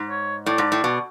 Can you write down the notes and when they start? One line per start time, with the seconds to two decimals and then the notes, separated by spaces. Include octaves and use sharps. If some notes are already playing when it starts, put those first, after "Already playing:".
Already playing: G#2
0.10 C#5
0.46 A2 D5
0.58 G#2
0.72 A2
0.84 B2